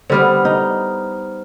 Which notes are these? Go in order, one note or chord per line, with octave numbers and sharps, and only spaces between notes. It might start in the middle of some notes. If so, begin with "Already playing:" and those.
D3 G3 B3 C5 F6
D#4